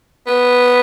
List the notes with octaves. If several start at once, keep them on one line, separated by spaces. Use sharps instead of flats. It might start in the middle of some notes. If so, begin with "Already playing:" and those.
B3